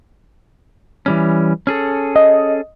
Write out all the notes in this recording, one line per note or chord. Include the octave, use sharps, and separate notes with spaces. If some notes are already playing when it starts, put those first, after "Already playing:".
E3 G3 C#4
C#4 G#4 A4
D#5